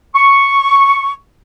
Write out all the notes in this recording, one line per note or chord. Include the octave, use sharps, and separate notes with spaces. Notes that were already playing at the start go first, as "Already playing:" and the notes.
C#6